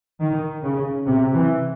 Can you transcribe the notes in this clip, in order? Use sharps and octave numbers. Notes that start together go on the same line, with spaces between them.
D#3
C#3
C3
E3